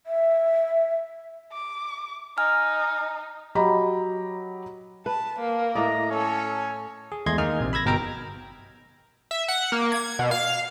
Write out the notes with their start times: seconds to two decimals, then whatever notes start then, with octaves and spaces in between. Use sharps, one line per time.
0.06 E5
1.53 D6
2.38 D#4 G#5 F6
3.55 F#3 G4 D#5 A#5 B5
5.06 B4 A5
5.39 A#3
5.75 A2 D5 D#5 A#5
6.11 C#4 A4 C#5
7.12 G#4
7.26 E2 G#3 A3 D#5 C6 G#6
7.38 D#3 A#3 D#4 G#4 F6
7.60 A#1 C3
7.73 B5 E6 G#6 A#6
7.85 G1 B2 A#4 G5 A#5 F6
9.31 E5
9.48 F#5
9.72 A#3
9.92 G#6
10.19 B2
10.31 F5